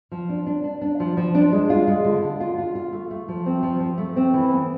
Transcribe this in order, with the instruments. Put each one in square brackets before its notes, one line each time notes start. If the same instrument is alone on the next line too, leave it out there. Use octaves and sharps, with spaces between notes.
[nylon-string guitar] F3
D4
D4
D4
D4
F3
F3
D4
G#3
F4
G#3
D3
D3
F4
F4
F4
A3
A3
F3
C4
F3
F3
A3
C4
E3
B3